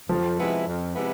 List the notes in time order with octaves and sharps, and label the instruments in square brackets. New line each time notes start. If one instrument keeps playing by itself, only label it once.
[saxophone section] F2 [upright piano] F3
[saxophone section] C3 G#3 B3 E4
F2
C3 G#3 B3 E4